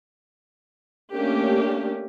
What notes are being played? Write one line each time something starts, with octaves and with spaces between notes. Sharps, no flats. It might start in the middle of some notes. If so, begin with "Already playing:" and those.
A3 A#3 C#4 D4 G4